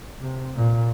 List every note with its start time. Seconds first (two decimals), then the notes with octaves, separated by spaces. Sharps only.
0.21 C3
0.55 A#2